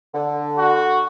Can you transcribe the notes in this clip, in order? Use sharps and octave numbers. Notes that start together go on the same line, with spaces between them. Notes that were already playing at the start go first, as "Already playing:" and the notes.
D3
F#4